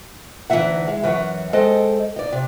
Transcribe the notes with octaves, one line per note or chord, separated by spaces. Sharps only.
D2 E3 C#4 D#4 E5 F#5
G#3
F#2 E3 C#5 F#5
G#3 A4 C5 D#5 G5
D#4 D5
C3